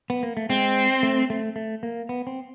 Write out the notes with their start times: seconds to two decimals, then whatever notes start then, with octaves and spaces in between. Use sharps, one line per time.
0.10 B3
0.23 A#3
0.37 A3
0.49 G#3 C4
1.03 A3
1.30 A3
1.56 A3
1.83 A#3
2.09 B3
2.27 C4